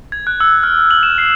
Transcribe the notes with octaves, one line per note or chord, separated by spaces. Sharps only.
G#6
F#6
E6
F6
F#7
E7
C7